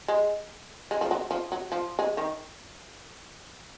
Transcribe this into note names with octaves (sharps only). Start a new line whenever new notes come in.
G#3
G#3
F3
F#3
F3
F#3
F3
G#3
D#3